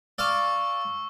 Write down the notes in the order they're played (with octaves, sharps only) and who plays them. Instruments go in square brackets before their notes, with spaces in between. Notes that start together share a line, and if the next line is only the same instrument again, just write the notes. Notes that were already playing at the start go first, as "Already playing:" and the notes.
[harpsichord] D5 F5 [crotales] C#6 E6